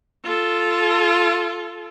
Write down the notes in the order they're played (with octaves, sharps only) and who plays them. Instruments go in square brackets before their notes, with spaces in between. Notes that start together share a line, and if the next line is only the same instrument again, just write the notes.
[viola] F4 A4